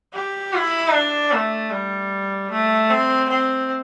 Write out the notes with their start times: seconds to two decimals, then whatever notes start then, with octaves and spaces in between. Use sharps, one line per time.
0.14 G4
0.53 E4
0.92 D4
1.32 A3
1.71 G3
2.50 A3
2.90 C4
3.28 C4